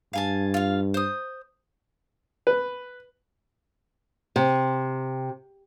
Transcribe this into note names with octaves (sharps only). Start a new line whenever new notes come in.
G2 F5 G#5 A5
F4 F5
C5 D#6
B4
C3